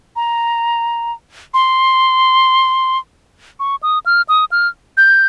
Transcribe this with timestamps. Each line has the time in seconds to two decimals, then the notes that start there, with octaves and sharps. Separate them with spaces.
0.16 A#5
1.54 C6
3.60 C#6
3.83 D#6
4.06 F6
4.29 D#6
4.52 F6
4.97 G6